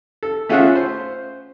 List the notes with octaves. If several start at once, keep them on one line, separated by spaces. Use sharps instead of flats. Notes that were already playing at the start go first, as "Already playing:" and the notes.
A4
A3 C#4 F4 G#4 E5 F#5
C5